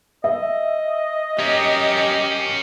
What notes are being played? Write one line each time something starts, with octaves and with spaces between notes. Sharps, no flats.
D#5 E5
C#4 G4 A#4